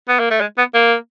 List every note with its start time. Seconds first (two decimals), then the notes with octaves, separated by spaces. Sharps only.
0.09 B3
0.20 A#3
0.31 A3
0.41 G#3
0.58 B3
0.75 A#3